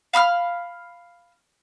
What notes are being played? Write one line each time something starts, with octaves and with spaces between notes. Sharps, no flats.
F5 B5 E6 F6